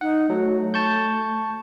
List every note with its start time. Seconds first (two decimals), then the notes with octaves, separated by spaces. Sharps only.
0.01 D#4 F#5
0.30 F#3 A3
0.74 A5 C#6 G6